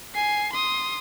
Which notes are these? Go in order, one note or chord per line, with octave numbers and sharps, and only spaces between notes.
G#5 C7
C6 D#6